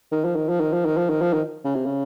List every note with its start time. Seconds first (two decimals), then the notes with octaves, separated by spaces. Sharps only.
0.12 D#3
0.24 F3
0.36 D#3
0.49 F3
0.60 D#3
0.73 F3
0.85 D#3
0.97 F3
1.09 D#3
1.21 F3
1.33 D#3
1.64 C#3
1.75 C3
1.85 C#3